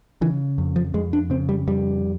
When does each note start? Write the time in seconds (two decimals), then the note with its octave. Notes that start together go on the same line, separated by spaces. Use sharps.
0.21 C#3 E3
0.58 F2
0.76 F3
0.94 F2 G#3
1.13 D4
1.30 C#3 C4
1.49 G3
1.67 F2 G3